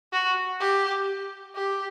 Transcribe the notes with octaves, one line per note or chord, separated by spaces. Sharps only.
F#4
G4
G4